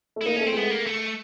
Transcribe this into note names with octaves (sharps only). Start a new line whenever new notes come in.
A3
E4
A#3 D#4
A3 C#4
C4
G#3 B3
A3
A#3
A3